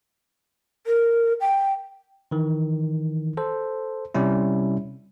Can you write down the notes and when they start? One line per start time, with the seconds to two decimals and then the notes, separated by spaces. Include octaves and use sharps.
0.87 A#4
1.41 G5
2.31 D#3 E3
3.37 A4 C5
4.15 C3 G3 C#4 E4